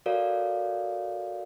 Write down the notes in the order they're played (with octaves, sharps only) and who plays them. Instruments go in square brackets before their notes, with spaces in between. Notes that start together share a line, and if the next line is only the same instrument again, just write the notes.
[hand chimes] F#4 A4 A#4 C#5 D5 F5